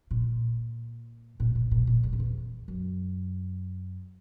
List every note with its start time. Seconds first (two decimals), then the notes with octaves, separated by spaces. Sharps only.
0.11 A#2
1.40 A#2
1.55 B2
1.71 A#2
1.87 A#2
2.03 E2
2.13 F2
2.20 E2
2.68 F#2